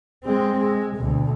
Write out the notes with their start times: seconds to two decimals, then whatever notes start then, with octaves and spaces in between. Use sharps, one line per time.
0.24 G#3 C4
0.59 G#3
0.96 D2 B2